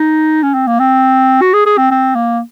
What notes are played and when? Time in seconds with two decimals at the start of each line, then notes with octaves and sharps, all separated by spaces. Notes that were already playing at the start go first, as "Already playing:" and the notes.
Already playing: D#4
0.43 C#4
0.54 C4
0.67 A#3
0.79 C4
1.42 F#4
1.53 G#4
1.66 G#4
1.77 C4
1.91 C4
2.15 A#3